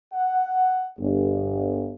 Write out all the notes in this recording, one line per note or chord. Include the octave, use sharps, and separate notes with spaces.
F#5
G1